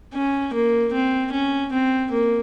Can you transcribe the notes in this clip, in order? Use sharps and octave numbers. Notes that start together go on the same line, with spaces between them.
C#4
A#3
C4
C#4
C4
A#3